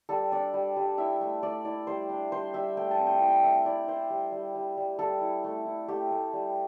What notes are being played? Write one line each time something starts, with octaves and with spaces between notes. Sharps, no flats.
G3 A4
D4 D5
G3
G3
E4 E5
A3
A3 D5
E4 D5
G3 C5
D4
G3 C5
G3 E5
A3 G5
A5
C4
G5
E4 G5
A3 E5
E4 D5
E4 C5
G3
G3
G3
G3
G3 A4
E4
A3
E4
A3 G4
A3
G3